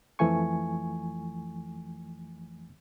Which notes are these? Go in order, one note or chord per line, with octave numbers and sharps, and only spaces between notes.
F2 E3 F3 A3 G#5 C#6